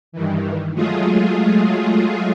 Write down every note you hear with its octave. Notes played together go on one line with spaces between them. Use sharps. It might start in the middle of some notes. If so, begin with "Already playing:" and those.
G2 D#3 E3
F#3 G#3 A3 F4 G#4